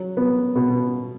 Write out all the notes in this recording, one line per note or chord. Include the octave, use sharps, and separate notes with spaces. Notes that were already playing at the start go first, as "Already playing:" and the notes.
Already playing: F#3
B3
B2